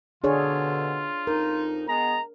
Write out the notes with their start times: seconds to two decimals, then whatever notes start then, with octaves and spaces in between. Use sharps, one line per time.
0.24 B2 D3 D4 F4 G#4 C#5
1.27 F2 D#4 A#4
1.88 G#3 B3 A#5